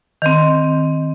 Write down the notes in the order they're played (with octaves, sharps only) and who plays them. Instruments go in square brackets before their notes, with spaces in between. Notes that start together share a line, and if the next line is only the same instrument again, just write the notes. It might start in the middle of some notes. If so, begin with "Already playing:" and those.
[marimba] D#3 C4